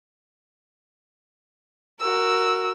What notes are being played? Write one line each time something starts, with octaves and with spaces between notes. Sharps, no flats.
F#4 A#4 E6